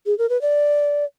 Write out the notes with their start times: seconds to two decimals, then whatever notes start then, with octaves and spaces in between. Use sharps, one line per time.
0.06 G#4
0.18 A#4
0.29 B4
0.42 D5